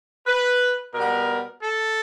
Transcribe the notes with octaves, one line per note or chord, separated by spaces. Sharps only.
B4
B2 G3 B3 A#4
A4